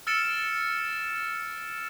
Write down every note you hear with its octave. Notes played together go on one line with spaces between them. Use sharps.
E6 F6 A6 C#7 D7 E7